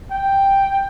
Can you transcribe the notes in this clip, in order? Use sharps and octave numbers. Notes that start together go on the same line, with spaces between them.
G5